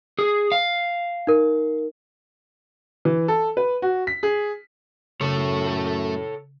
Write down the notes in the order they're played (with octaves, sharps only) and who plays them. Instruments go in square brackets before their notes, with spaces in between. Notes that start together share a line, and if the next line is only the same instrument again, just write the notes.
[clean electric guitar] G#4
F5
[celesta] D#4 A#4
[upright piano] E3
A4
B4
F#4
B6
G#4
[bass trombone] F#2 [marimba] C#3 [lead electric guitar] A3 [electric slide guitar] A4 C#5